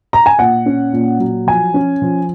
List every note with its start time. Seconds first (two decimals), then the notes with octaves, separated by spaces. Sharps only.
0.13 A#5
0.26 G#5
0.39 A#2 F#5
0.66 C#4
0.93 A#2
1.20 F#3
1.47 F3 G#5
1.74 C#4
2.02 F3